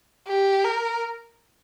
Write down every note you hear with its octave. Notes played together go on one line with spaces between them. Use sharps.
G4
A#4